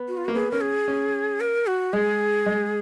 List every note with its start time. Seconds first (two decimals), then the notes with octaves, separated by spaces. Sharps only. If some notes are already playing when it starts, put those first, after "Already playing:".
Already playing: B3
0.08 F#4
0.17 F4
0.25 A#3 F#4
0.35 B3 G#4
0.51 C#4 A#4
0.61 G#4
0.88 C#4
1.41 A#4
1.67 F#4
1.93 G#3 G#4
2.46 G#3